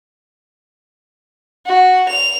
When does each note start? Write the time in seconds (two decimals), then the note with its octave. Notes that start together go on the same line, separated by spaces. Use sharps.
1.66 F#4
2.08 F7